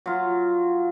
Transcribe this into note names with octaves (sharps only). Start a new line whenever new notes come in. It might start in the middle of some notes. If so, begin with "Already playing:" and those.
F#3 F4